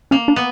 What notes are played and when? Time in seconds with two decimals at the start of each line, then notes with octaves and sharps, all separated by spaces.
0.11 A#3 C#4
0.28 D4
0.36 B3